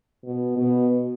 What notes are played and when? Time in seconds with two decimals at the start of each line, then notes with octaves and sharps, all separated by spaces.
0.24 B2
0.57 B2